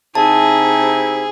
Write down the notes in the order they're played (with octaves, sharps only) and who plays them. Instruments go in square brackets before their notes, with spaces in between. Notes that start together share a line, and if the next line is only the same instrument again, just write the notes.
[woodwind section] C3 D#4 E4 [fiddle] G#4 [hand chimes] A5